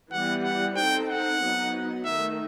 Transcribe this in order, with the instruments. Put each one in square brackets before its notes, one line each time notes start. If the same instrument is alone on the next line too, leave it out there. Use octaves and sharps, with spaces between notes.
[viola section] E3 G3 B3 [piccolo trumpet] F#5
[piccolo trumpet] F#5
[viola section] C4 D#4 A4 C5 [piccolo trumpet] G5
[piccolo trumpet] F#5
[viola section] F#3 B3 D#4
[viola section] D#3 A3 D#4 [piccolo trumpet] E5